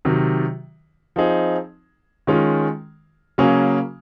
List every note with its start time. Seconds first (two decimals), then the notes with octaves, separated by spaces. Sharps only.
0.05 C3 D#3 F#3
1.16 F3 C4 D#4 G#4
2.27 D#3 G#3 C#4 F4
3.38 C#3 F#3 A#3 C#4 G#4